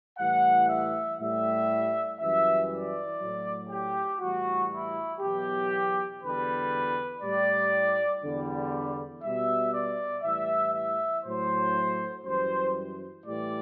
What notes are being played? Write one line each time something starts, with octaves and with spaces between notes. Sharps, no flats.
A2 E3 G3 F#5
E5
A2 G3 E5
F#2 E3 G3 E5
D5
A2 F#3
G4
A2 E3 G3 F#4
E4
E2 B2 F#3 G4
E2 D3 G3 B4
A2 G3 D5
E2 D3 G3
B2 G3 E5
D5
A2 E3 G3 E5
E5
A2 F#3 C5
F#2 E3 G3 C5
A2 E3 G3 D5